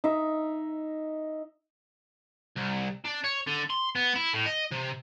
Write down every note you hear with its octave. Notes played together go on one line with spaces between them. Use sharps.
D#4 E5
C2
D4
C#5
D3
C6
B3
E4
A2
D#5
C3